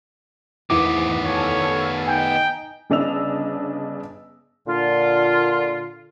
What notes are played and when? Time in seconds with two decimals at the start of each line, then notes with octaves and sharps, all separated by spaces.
0.70 E2 G#2 D#3 E3 B3 E4 D6
1.25 A4 C#5 F5 G#5
2.08 D#4 G5 G#5
2.90 G1 C#3 D4 D#5 E6 F7
4.67 A#2 D3 F4